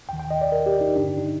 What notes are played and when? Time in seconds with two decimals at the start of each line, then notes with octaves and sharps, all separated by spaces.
0.09 D#2 D#3 G5
0.20 G5
0.31 D#5
0.41 D5
0.52 A#4
0.66 G4
0.81 D#4
0.95 G1 G2 D3 D4
1.06 D4
1.17 D#4